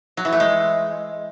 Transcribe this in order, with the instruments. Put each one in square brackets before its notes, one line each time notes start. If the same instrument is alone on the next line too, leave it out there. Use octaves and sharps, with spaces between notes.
[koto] F#3
E3
A3
G#3